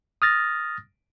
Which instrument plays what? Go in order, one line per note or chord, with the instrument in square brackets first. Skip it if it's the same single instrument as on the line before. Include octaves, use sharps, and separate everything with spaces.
[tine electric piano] D#6 F6 A6 A#6